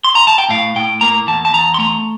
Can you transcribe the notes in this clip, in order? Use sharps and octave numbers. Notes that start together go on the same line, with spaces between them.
C6
A#5
A5
G5
A2 F5
A2 G5
A#3 A#5
E2 A5
A5
E2 A#5
C6
A3 A#5